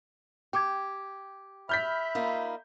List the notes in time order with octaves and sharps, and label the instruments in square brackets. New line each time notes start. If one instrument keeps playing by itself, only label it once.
[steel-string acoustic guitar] G4 [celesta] G5 D6 G#6
[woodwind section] E5 B5 [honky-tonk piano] F6 G6 B6
[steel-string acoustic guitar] A#3 D#4 F4